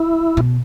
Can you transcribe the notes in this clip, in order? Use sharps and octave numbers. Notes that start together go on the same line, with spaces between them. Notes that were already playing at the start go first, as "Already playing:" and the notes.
Already playing: E4
B2